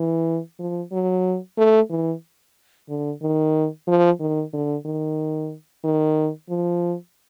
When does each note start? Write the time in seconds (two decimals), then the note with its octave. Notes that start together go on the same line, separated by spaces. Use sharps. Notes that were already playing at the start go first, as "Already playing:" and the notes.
Already playing: E3
0.59 F3
0.92 F#3
1.57 A3
1.90 E3
2.89 D3
3.22 D#3
3.87 F3
4.19 D#3
4.53 D3
4.85 D#3
5.84 D#3
6.49 F3